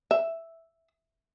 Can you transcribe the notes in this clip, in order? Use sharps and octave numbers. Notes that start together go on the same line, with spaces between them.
E5